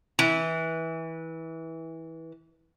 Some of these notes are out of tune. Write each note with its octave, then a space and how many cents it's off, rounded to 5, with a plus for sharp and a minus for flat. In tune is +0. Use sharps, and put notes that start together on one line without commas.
E3 -20